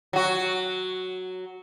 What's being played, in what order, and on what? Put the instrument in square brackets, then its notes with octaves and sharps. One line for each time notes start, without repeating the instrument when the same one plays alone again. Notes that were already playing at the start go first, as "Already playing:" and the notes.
[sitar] F#3 F#4